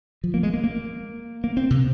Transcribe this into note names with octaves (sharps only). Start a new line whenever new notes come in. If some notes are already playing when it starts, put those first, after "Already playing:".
F3
A#3
G#3
A#3
A#3
A#3
C4
C3